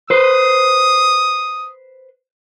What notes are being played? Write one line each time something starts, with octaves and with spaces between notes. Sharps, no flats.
B4 C5 D#6